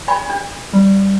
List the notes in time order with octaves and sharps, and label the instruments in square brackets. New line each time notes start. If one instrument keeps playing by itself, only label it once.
[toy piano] D5 G#5 B5
D4
[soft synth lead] G3